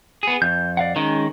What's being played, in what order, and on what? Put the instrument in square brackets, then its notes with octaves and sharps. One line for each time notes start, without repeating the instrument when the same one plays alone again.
[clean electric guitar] B3 G#4
[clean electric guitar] F2 [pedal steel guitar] G6
[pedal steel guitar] D5 F5 F#5
[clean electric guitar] D#3 [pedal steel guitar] G#3 C#4